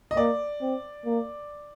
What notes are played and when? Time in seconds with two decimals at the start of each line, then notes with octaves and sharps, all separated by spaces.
0.11 D#5
0.17 A#3 D5
0.61 C4
1.05 A#3